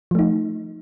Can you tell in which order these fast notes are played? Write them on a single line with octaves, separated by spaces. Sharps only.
F3 A3 D#4